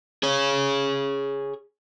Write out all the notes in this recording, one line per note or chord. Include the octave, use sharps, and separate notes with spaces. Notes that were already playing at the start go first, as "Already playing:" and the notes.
G#4 C#5